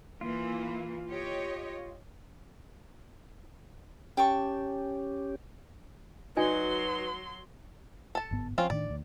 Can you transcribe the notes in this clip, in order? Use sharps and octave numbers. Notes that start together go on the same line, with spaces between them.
E3 A#3 F4
G4 C#5 D#5
C#4 G4 G5 A5 C#6
F#3 D#4 F#4 B4 D5 G#5 C6
A4 A5
G1 G#2 B3
F3 C4 C#4 F4
A2 D#3 D4 D5
D2